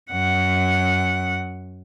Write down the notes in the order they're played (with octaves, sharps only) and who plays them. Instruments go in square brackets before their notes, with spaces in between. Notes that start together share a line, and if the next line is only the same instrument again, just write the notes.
[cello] F#2 F#5